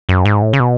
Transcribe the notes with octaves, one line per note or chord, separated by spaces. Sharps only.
F#2
G#2
A2
C#3
B2